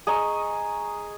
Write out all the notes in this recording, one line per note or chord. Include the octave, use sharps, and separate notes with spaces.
G#4 D#5 A#5 C#6